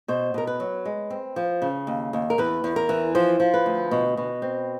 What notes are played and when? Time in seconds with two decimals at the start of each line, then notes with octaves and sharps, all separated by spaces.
0.08 B2 C5
0.34 B2 A#4
0.47 B4
0.60 F#3
0.85 G#3
1.10 C4
1.36 F3
1.62 C#3
1.87 D#2
2.13 D#2
2.30 A#4
2.38 E2 B4
2.64 E2
2.76 A#4
2.89 E3
3.15 F3 C5
3.40 F3
3.54 B4
3.66 D2
3.91 B2
4.17 B2
4.42 C4